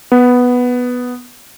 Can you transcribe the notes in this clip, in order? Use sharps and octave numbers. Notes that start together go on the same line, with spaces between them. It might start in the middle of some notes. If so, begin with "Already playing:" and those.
B3